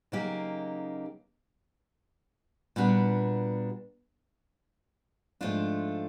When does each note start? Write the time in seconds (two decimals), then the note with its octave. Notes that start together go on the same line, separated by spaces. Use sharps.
0.12 C#3 F#3 A#3 D#4 G4
2.76 A#2 G3 B3 D4 F#4
5.41 G#2 F3 A3 D4 F4